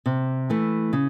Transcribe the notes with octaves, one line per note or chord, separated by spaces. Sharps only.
C3
E3 A3
C#3